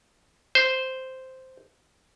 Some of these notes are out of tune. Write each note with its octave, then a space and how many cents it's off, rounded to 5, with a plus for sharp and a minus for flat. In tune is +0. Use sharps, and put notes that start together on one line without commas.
C5 -5